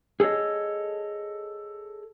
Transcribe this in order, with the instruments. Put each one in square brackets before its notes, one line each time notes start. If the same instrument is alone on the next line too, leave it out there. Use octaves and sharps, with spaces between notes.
[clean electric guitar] G#4 A4 C5 C#5 D#5